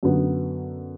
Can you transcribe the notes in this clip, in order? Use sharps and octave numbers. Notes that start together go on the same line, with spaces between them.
F#2 D3 F#3 B3